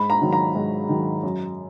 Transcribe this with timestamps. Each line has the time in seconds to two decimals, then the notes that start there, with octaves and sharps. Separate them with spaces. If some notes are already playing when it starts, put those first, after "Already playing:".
Already playing: G#2 B5
0.10 A#5
0.22 D#3 F#3
0.33 A#5
0.55 G#2
0.89 D#3 F#3
1.23 F#2